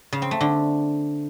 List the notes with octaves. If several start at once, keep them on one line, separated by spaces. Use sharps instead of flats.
C#3
C4
A3
D3